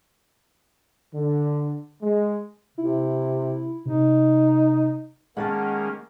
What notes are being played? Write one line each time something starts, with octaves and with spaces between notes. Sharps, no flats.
D3
G#3
C3 E4
C3 D#4
D#3 G#3 A#3 C#4 F#5 G#5 A5